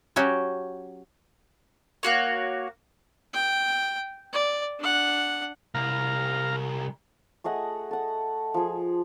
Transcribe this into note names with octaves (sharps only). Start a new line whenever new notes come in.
F#3 C#4 F#4 G4
A#3 F#4 C#5
G5
D5
D4 F#5
C2 F5 A#5
A3 G#4 D#5 F#5
A4 F#5
F3 G#4